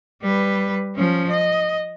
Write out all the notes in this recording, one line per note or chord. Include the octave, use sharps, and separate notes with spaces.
G3 B4
F3 C#4
D#5